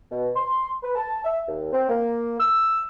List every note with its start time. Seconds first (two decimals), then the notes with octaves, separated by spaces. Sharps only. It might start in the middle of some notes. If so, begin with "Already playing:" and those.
0.11 B2
0.36 C6
0.83 B4
0.96 A5
1.24 E5
1.48 D#2
1.73 C4
1.89 A#3
2.40 E6